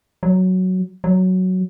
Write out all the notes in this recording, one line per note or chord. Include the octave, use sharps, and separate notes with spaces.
F#3
F#3